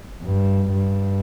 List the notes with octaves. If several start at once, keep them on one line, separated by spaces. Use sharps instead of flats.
G2
G2